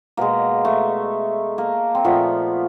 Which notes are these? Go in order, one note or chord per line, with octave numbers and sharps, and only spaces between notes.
B2 G#3 A#3
A3
A#3
C4
A#2 F3 A3 B3